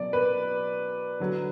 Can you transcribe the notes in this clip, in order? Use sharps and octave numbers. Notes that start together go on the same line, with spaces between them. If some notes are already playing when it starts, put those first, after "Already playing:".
Already playing: B2 F#3 D5
B4
D3 F#3